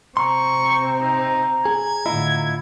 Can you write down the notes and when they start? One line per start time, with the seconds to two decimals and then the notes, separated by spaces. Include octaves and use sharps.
0.17 C3 C4 A#5 C6 C#6
1.02 D#4
1.65 G#4 G#6
2.06 A2 D3 E4 F4 D#5